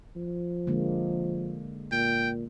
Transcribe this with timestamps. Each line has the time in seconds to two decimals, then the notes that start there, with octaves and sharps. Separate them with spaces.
0.16 F3
0.67 D3 G#3 A#3
1.92 A#2 G5